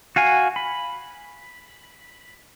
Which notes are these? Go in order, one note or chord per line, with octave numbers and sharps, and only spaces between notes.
F#4 F5 G#5
B5